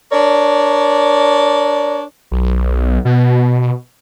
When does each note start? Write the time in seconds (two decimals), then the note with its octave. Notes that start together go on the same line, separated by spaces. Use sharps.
0.12 D4 A#4 C#5 D5
2.32 B1
3.05 B2